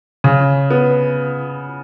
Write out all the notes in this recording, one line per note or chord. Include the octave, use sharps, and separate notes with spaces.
C#3
B3